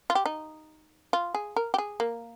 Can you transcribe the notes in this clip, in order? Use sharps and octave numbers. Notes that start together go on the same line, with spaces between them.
F4
G4
D#4
F4
G#4
A#4
G4
G#4
A#3